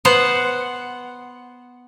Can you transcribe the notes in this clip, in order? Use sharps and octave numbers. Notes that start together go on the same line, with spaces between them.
B3 C5 F#5